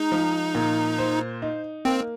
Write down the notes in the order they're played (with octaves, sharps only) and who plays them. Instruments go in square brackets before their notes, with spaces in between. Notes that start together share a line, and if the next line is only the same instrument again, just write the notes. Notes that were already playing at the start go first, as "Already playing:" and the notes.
Already playing: [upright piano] G#3 [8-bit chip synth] D#4
[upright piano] F3
A#2
C5
D#4
[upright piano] A#3 [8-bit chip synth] C4